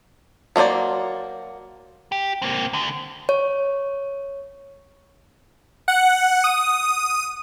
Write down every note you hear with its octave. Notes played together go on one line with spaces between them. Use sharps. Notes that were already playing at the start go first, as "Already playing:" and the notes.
F#3 A#3 F4 C5 D5
G4
A#3 C4
D2 D3
C#5
F#5
D#6